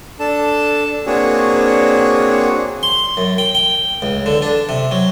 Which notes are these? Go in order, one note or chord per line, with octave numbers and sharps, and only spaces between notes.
D4 A4 A5
A#3 C4 D4 F#4 G#4 C#5
C6
F#2
G5
G5
C#2
D3
D4
C3
F#3